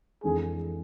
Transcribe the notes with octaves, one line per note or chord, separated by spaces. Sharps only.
F2 E3 G#3 D4 G#4 A4